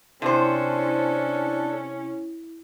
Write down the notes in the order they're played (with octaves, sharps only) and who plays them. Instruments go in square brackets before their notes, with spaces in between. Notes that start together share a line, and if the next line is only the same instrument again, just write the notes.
[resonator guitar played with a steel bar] C3 C5 [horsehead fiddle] C#4 [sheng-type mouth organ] D4 A4 [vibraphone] E4